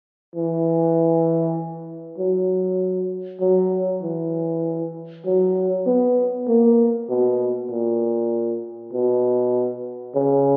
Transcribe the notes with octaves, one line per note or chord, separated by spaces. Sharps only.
E3
F#3
F#3
E3
F#3
B3
A#3
B2
A#2
B2
C#3